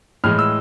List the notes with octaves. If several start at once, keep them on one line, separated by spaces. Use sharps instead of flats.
A2 E3 G#3 F6
E6